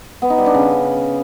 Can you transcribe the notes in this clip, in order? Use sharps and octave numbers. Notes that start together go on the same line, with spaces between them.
B3
D#4
G3
D4
C#3